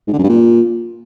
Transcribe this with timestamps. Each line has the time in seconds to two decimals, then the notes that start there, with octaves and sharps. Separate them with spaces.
0.08 G#2
0.13 D3
0.19 F#2
0.24 G2
0.29 A#2